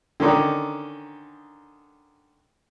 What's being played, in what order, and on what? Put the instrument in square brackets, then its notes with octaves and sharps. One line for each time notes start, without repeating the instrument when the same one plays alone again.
[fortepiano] D3 D#3 C#4 D#4